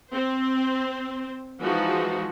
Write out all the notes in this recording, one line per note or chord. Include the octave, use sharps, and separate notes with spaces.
C4 C5
E3 F3 G#3 D#4 F#4